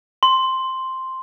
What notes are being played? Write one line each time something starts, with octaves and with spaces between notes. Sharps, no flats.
C6